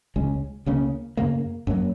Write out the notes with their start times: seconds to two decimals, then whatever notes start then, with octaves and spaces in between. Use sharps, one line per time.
0.16 C#2 C#3 G#3 C#4
0.66 C#2 C#3 A#3 C#4
1.17 F#2 C#3 A#3
1.67 F#2 F#3 A#3